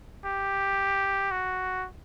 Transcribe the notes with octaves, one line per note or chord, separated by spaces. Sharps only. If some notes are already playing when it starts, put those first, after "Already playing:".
G4
F#4